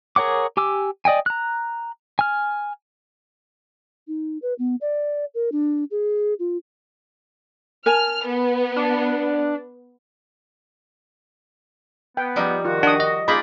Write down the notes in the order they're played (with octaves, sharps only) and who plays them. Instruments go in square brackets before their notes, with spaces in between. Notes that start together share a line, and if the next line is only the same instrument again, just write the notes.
[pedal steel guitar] G#4 A#4 C#5 F#5 D6
G4 G#5 D6 E6
D5 D#5 G5 G#5
A#5 F#6
G#5 F6
[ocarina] D#4
B4
B3
D5
A#4
D4
G#4
F4
[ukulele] A#4 G#5 A5 [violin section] F6
[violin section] B3
[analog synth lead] D4
[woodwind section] B3 [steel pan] G5
[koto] F3 G3 D#4
[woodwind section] D#3 F#4 [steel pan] F4
[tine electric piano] D4 [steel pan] F#5 D#6
[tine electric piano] D#5
[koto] A#3 D#4 G#4 [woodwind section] F4 D5 [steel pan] B5